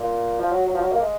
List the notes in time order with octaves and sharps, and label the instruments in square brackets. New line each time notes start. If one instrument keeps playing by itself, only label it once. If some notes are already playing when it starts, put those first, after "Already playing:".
Already playing: [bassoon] A#2
F3
F#3
F#3
F3
F#3
A#3
G#3